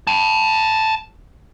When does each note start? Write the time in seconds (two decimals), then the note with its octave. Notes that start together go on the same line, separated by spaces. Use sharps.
0.07 G5 A5